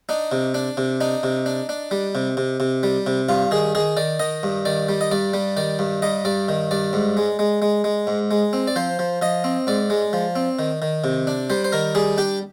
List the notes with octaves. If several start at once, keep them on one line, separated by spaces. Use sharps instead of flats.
D4 D#4
C3
D4
C3
D4 D#4
C3
D4
D4
G3
C3
C3
C3
G3
C3
G2 F4
D#3 G#4
D#3 G#4
D#3 D5
D#3 D#5
G2
D#3 D5
G3
D#5
G2 D5
G3
D#3 D5
G2
G3 D#5
G2 D5
D#3
G2 D5
G#2
G#3
G#3
G#3
G#3
G#2
G#3
C4
D5
F3 C5
F3
F3 D#5
C4
G#2 D5
G#3
F3
C4
D#3
D#3
C3
D4
G3 C5
C5
D#3 A#4
G3 G#4
D4 G4